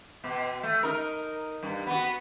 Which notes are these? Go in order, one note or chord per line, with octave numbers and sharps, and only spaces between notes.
B2
A3
D#4 A#4
G2
B3 F#4